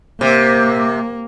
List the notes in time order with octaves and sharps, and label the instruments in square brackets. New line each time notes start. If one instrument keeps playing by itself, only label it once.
[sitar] C3 [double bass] A#3